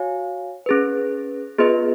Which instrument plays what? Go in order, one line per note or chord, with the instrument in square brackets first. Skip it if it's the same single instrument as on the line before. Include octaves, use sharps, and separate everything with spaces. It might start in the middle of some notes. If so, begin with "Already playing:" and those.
Already playing: [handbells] F#4 C#5 F5 G#5
C#4 G#4 B4
B3 F4 G#4 B4 D#5